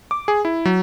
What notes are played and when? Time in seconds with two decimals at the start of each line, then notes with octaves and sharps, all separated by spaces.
0.11 D6
0.28 G#4
0.45 E4
0.65 F#3